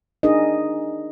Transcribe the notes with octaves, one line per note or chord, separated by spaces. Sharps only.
D4 D#4 G#4 A#4 D#5